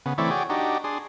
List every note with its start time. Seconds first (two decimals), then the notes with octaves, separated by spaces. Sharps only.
0.06 C#3 B3
0.18 E3 A3 C4 E4 C#5 D5
0.31 F#4 G#4 C#5 D5 G5
0.50 D4 D#4 F#4 G4
0.84 D4 G#4 C6